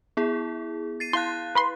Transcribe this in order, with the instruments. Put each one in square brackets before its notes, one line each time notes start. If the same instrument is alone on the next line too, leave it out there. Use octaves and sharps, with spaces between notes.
[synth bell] B3 E4 G#4
A6 C7 D#7
[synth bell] E4 F5 F#6 [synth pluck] C6
[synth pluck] B4 B5 C6